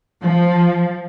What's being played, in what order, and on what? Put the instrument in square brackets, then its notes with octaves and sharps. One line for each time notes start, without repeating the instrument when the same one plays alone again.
[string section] F3